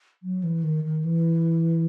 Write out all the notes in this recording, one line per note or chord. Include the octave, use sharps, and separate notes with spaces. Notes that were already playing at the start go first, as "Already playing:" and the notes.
F#3
E3
D#3
D#3
E3